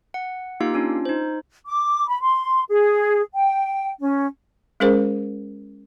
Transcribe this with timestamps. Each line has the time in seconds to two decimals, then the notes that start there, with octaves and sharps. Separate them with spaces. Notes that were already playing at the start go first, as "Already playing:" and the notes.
0.14 F#5
0.60 A#3 D#4 F4 G4 F5
0.74 C#4 D4 F4
1.05 D#4 C5
1.66 D6
2.07 B5
2.21 C6
2.69 G#4
3.34 G5
4.00 C#4
4.80 G#3 C#4 G#4 A#4 C5